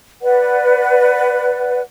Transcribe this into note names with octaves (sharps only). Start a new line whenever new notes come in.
B4 D5 F#5